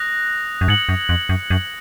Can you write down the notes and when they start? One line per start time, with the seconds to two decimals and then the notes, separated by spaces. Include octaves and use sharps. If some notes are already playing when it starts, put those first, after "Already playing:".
Already playing: D#6 F#6 A#6 F7
0.61 F#2
0.68 G#2 G#6 C#7 F#7
0.89 F#2
1.09 F2
1.29 F#2
1.50 F#2